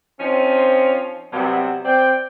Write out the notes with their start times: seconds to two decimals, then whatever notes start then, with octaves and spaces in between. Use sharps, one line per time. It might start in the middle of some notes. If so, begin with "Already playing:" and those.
0.19 F3 C4 C#4 D#4 F4
1.33 C3 F#3 G3 B3 C4 E4
1.85 C4 C5 D5 G5